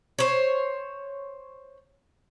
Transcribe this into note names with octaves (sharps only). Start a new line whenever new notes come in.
C5 C#5